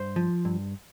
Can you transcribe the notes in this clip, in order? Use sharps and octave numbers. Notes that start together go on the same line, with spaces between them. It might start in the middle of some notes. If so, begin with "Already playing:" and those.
Already playing: G2 C5
F3
G2